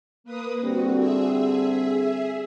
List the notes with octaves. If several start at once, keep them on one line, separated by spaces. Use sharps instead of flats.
A#3 B4 D#6
D3 G3 C4 F#4
G#4 E5